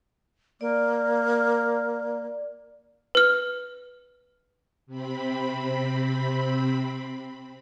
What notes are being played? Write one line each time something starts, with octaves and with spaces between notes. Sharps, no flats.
A#3 D5
B4 F6
C3 C4 B5